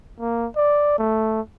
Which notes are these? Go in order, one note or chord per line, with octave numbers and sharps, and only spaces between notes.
A#3
D5
A3